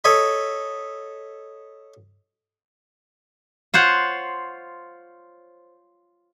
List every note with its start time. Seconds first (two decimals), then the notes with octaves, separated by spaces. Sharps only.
0.04 A4 C#5 D#5 B5
3.74 F4 C5 C#5 F#5